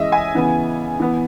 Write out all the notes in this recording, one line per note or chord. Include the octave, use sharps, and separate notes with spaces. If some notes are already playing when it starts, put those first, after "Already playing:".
Already playing: E3 G#3 C#4 D#5 E5
G#5
C#3 E3 B3
E3 B3